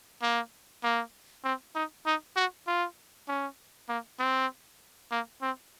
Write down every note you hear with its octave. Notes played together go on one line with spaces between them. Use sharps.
A#3
A#3
C4
D#4
D#4
F#4
F4
C#4
A#3
C4
A#3
C4